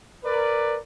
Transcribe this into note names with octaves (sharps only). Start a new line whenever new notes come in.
A#4 B4 D5